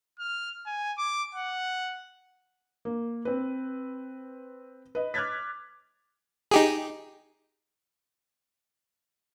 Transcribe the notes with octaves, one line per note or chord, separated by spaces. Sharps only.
F6
G#5
D6
F#5
A#3
C4 B4
B4 D#5
D6 F6 F#6 G#6 A6 B6
D#4 G4 G#4